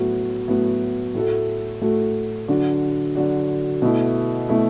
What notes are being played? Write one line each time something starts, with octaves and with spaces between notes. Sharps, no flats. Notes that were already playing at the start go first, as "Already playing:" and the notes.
Already playing: A2 F#3 B3 F#4
A2 F#3 B3 F#4
A2 A3 F#4 A4
A2 A3 F#4 A4
D3 F#3 D4 F#4
D3 F#3 D4 F#4
B2 A3 E4
B2 A3 E4